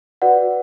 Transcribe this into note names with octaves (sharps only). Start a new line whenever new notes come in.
F#4 B4 D5 F#5